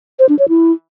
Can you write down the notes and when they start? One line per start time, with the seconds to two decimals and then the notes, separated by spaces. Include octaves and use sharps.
0.19 C5
0.29 D4
0.39 C#5
0.49 E4